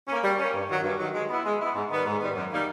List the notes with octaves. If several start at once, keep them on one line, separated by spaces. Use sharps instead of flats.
A#3 C#4
G3
A#3 C#4
G2
D#3 F#3
G2
D#3 F#3
G#3
B3 E4
G#3
B3 E4
G#2
D#3 G3 B3
G#2
D#3 G3 B3
F#2
D#3 G3 A#3 D#4